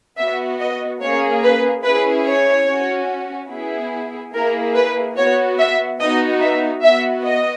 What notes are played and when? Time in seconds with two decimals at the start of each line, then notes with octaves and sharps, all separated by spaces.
0.18 B3 F#4 E5
0.60 D#5
1.01 A#3 C#4 G#4 C#5
1.43 B4
1.85 C#4 E4 G#4 B4
2.27 C#5
2.68 C#4 F#4
3.51 B3 E4 G#4
4.34 A#3 E4 G#4 A#4
4.75 B4
5.17 B3 F#4 C#5
5.59 E5
6.00 B3 D#4 F#4 D#5
6.41 E5
6.83 B3 F#4 E5
7.24 D#5